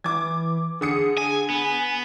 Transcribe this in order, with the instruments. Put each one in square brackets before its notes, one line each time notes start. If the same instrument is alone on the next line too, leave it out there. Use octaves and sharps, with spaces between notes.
[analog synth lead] E3 [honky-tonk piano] D6 G#6
[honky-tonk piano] D3 D#6 C#7 [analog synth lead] G#4
[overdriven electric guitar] G#5
[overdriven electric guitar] B3 [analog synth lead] G#5